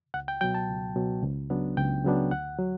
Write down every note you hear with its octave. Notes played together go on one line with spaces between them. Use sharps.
C#2 F#5
G5
B2 F#3 G5
A5
C#2
B2 F#3
C#2
C#3 F#3 B3 D4
C#2 G5
C#3 F#3 B3 D4
D2 F#5
F#3